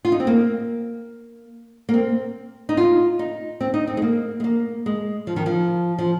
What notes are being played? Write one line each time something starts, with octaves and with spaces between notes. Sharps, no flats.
F4
D#4
C4
A#3
A#3
C4
D#4
F4
D#4
C4
D#4
C4
G#3
A#3
G#3
A#3
G#3
F3
D#3
F3
F3